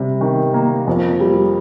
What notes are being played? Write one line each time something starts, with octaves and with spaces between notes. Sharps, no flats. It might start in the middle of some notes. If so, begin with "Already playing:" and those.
Already playing: C3 G3
D#3
A#3
F2
G3